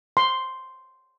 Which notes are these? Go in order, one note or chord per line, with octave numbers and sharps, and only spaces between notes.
C6